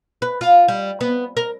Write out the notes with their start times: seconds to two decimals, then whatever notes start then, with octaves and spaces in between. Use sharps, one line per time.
0.22 B4
0.41 F4
0.68 G3
1.01 B3
1.37 A#4